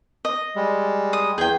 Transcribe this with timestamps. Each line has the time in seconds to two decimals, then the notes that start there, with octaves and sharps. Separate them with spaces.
0.25 D#5
0.56 G3 G#3
1.13 D#6
1.38 E2 G#4 G5 G6